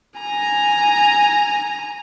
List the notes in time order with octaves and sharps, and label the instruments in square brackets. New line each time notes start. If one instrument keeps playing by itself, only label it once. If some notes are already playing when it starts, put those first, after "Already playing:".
[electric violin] G#5 A#5